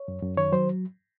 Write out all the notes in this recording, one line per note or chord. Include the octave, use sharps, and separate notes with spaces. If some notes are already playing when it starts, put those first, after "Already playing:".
Already playing: C#5
F#2
F#2
D#3 C#5
F#3 C5